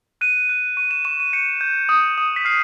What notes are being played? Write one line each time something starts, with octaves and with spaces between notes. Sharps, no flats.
F#6 D#7
F#6
C#6 D#7
E7
C#6 E7
D#7
G6 C#7
G6
D#6
D#6
B6
F6 C7